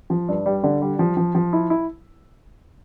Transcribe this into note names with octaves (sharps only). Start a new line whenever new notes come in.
F3
G2
G3
D3
G3
F3
F3
F3
E4
E4